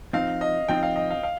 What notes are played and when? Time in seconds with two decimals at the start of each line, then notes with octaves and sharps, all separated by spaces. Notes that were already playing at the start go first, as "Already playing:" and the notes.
0.13 F3 C4 D#4 F5
0.41 D#5
0.68 F3 C4 D#4 G5
0.83 F5
0.96 D#5
1.11 F5
1.23 F5